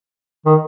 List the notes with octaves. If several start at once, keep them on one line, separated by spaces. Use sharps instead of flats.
D#3